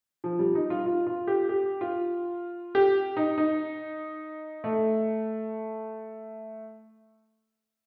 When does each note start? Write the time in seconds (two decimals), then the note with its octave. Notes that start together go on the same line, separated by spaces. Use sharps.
0.24 F3
0.39 G3
0.55 D#4
0.70 F4
0.86 F4
1.07 F4
1.27 G4
1.49 G4
1.81 F4
2.75 G4
3.17 D#4
3.38 D#4
4.64 A3